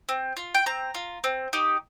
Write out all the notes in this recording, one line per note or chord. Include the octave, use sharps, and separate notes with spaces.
C4
F4
G5
C4 A#5
F4
C4
D#4 G4